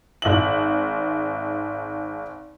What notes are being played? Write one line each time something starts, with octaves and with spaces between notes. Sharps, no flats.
G#1 E5 F#7